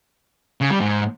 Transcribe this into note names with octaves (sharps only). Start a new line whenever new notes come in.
C#3
G3
G#2